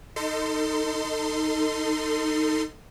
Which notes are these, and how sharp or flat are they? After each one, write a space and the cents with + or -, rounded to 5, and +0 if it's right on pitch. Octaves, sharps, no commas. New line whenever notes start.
D#4 +0 A4 +30 C6 -20